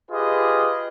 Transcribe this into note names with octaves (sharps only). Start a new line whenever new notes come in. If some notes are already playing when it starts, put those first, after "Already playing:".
F4 G4 G#4 B4 D#5